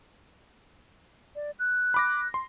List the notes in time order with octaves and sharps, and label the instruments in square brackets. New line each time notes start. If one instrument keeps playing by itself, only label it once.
[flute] D5
F#6
[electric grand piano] B5 D6 A#6
C6